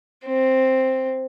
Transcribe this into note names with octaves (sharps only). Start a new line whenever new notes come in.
C4